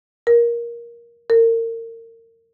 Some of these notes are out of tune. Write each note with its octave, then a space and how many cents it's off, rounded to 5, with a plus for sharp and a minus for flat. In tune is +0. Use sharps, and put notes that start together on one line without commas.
A#4 +15
A#4 -35